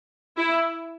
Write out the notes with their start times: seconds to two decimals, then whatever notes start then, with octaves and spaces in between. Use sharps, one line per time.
0.38 E4